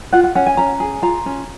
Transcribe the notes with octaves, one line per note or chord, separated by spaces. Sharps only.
F4 F#5
F#5
C#4 F#5
G#5
C#4 A#5
G#4
F4 A#5
C#4